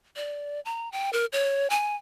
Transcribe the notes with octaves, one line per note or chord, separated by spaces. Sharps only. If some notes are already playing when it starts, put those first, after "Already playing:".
D5
A#5
G5
A#4
C#5
G#5